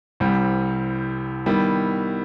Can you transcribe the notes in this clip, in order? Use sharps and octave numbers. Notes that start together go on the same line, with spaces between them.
C2 C3 E3 G3
D#3 G3 B3 E4